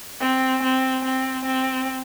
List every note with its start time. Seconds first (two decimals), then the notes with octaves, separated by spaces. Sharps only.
0.21 C4
0.63 C4
1.05 C4
1.45 C4